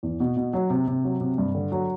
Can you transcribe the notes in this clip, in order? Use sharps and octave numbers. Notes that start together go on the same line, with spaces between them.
E2
B2
B2
F#3
C3
C3
F#3
C3
G2
D3
F#3